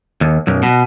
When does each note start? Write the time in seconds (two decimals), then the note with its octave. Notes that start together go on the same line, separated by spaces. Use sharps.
0.21 D#2
0.47 B1 F#2
0.63 B2